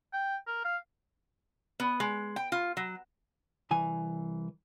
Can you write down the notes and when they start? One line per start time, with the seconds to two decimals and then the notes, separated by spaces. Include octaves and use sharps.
0.13 G5
0.47 A#4
0.65 F5
1.80 B3
2.00 G#3
2.36 G5
2.52 F4
2.77 F#3
3.71 C2 E3 G#5